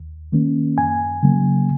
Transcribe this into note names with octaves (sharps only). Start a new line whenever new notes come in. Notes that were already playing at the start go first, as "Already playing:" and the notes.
Already playing: D#2
D#3 A#3 C#4
F#2 G#5
C#3 F#3 A#3